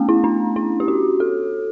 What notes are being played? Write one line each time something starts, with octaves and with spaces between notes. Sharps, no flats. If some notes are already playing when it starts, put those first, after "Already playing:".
Already playing: A3 B3 C#4
E4
D4
E4
G4
F#4
A4